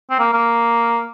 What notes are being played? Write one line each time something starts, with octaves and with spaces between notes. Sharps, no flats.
C4
A#3
A#3